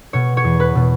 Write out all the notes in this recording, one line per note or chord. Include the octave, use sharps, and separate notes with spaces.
B2 C#5
C#5
E2
B4
B2